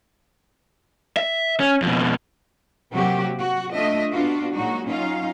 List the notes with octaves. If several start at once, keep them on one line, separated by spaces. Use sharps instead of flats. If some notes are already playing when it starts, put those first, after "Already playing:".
E5
C#4
F2 B2
C3 F#3 A#3 F#4 G4
F#4
A3 D4 F4 D#5 E5
B3 D4 F4 F#4
A#2 F#3 G#3 D#4 F#4
F#3 C#4 D#4 F4 F5